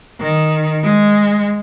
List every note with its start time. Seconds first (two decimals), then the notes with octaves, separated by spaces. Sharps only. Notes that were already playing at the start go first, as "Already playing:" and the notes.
0.20 D#3
0.83 G#3